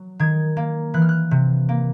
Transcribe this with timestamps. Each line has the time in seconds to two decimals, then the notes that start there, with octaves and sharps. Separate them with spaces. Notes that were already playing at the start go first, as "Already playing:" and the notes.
Already playing: F#3
0.19 D#3 G#6
0.57 A#3
0.94 E3 F#6
1.02 F6
1.09 F#6
1.31 C3
1.69 A#3